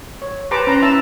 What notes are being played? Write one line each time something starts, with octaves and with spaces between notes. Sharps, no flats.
C#5
G4 B4 C5 A5 A#5 D6
C#4 B4 A#5 C6
E4 E5 A5 A#5 E6